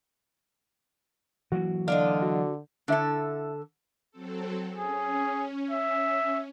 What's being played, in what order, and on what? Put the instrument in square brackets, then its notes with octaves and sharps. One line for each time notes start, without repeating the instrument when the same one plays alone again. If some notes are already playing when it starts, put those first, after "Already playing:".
[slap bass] E3 F#3 A#3 [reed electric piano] F#4
[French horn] D3 [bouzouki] D4 F4 D#5 [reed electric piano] F5 F6
[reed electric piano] F#4
[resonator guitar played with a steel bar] D3 A4 [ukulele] E4 C#5 E5
[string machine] F#3 C4 A4
[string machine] C#4 [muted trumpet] G#4
[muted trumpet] E5